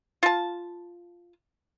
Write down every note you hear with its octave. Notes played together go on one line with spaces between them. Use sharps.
F4 A5